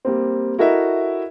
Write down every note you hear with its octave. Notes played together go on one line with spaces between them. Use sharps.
G3 A#3 C4
E4 F#4 A4 A#4 D#5 E5